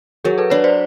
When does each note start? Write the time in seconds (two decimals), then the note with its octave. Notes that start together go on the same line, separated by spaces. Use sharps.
0.25 F#3 G#4 A#4
0.38 A4 B4
0.50 D4 B4 C#5
0.64 C5 D5